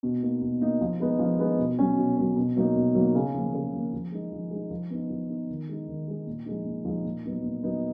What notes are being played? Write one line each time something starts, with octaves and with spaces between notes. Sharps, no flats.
B2
A#3 D#4
B2
A#3 D#4
F3
G#3 B3 D#4
F3
G#3 B3 D#4
B2
F#3 C#4
B2
F#3 C#4
B2
F#3 A#3 D#4
B2
F#3 A#3 D#4
C#3
F3 A#3
C#3
F3 A#3
F3
G#3 D#4
F3
G#3 D#4
F3
B3 D#4
F3
B3 D#4
D#3
G#3 D#4
D#3
G#3 D#4
A#2
F3 G#3 D#4
A#2
F3 G#3 D#4
A#2
F#3 B3 D#4
A#2
F#3 B3 D#4